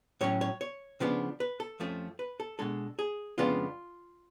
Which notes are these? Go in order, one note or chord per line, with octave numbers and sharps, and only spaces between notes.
A2 F#3 C#4 C#5
C#5
C#5
C#3 F3 B3 D4
B4
A4
F2 F3 A3 C#4
B4
A4
B2 G#3 D4 A4
G#4
F2 C#3 G#3 B3 D4 F4